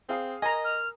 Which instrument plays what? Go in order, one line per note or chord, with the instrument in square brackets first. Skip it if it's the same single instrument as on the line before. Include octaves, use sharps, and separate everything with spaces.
[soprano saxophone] C4 [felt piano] G#4 F5 D#6
[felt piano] A#4 [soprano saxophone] D#5 [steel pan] G#5 A#5
[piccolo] F6